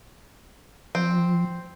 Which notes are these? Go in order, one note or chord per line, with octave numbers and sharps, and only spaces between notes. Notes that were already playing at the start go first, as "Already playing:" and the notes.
F3 C4